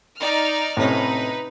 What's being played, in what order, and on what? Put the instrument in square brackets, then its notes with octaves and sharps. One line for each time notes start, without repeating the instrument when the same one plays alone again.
[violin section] D#4 D5 F6
[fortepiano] A2 C3 C#4 [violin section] D#4 B4